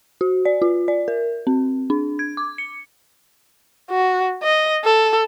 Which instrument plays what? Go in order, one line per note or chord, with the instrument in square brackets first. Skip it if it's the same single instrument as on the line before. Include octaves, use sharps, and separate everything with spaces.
[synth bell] F#4
D5
F4
D5
A#4
C4
D4
G#6
D6
C#7
[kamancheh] F#4
D#5
A4